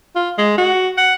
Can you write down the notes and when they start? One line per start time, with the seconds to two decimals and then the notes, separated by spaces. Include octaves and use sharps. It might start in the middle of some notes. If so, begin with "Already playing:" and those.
0.16 F4
0.38 G#3
0.58 F#4
0.97 F#5